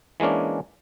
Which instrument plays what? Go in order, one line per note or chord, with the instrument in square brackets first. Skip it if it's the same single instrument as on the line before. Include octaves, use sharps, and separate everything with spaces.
[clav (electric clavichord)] E3 G#3 A#3 C#4 D4